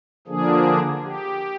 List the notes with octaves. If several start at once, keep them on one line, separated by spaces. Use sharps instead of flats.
D3 F3 A#3 D4 G#4
G4